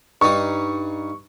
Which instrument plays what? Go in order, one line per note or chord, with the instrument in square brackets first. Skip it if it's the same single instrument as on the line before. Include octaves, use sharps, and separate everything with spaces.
[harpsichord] G2 D#4 [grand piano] C#6